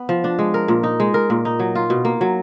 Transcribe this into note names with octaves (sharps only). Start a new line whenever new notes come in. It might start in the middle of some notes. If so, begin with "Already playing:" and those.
Already playing: B3
F3
D4
G#3
A#4
A#2
D#4
G#3
A#4
A#2
D#4
F#3
F4
B2
A#3
F#3